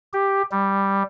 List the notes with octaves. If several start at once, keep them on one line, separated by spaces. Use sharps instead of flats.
G4
G3